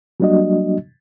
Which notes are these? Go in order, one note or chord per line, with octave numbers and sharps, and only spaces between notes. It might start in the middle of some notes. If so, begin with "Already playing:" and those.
F#3 G3 A#3 D4 F#4 D#5